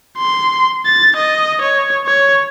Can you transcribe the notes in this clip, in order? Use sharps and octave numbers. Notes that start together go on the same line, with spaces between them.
C6
A6
D#5
C#5
C#5